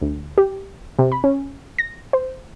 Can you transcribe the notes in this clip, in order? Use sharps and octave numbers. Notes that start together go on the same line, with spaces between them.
D2
G4
C3
B5
C#4
A#6
C5